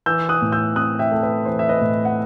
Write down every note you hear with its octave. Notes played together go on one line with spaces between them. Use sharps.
E3 E6 G6
D#6 F#6
A2
E6 G6
C4 D#6 F#6
E5 G5
A3
B4
E3 C5
E5
B4 D#5
A2
F#5